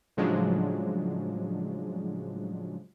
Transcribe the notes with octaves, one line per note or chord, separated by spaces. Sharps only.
A2 C#3 F3 F#3 G#3 D4